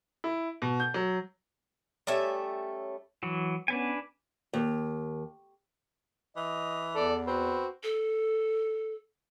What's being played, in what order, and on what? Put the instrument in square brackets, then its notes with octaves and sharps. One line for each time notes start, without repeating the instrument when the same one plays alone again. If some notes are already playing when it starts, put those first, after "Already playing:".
[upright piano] E4
B2
G6
F#3
[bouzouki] G3 A3 C#4 E5
[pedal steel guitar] E3 F#3
[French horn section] B3 C#4 [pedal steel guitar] D4 B4 G#5
[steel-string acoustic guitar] D#2
[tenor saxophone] E3 [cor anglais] D#5
[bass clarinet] E2 [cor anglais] A4 [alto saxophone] D5
[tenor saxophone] C4 [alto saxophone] F#4 [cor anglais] B4
[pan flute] A4